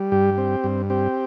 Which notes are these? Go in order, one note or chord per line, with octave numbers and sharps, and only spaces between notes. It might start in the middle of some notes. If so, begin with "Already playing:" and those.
Already playing: G3
G2 G4
C4
G2
C4 G4